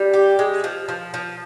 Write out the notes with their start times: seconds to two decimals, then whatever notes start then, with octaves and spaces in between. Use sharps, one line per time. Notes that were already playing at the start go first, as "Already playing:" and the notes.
Already playing: G3
0.14 G4
0.39 G#3
0.64 F3
0.89 F3
1.14 F3